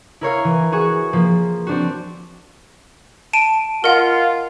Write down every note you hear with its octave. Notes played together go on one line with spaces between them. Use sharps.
E4 A#4 C#5 F5
E3
F#4 G#4 C#6
F3 A#3
C4 D4 F#4
A5 D7 D#7
F4 A#4 D#5 F#5